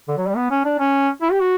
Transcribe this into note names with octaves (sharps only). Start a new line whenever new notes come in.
D3
F#3
G3
B3
C#4
D4
C#4
E4
G4
F#4